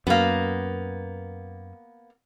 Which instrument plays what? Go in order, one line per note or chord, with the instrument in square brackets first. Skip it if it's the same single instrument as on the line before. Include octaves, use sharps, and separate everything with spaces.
[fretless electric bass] F#2 [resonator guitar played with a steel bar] A#3 B3